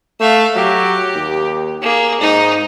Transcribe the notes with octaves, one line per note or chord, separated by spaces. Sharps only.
A3 E5 F5
F#3 G4
D#2
A#3 G#4
G#2 D#4